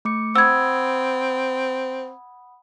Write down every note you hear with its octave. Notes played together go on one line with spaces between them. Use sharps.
A3 D6 C#7
C4 F#5 B5 D#6 E6 G#6